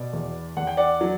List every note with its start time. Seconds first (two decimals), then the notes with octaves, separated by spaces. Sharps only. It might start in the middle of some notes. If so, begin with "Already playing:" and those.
Already playing: B2 B4 D5
0.13 E2
0.57 E2 F#5
0.67 G5
0.77 D5 F#5
1.01 F#3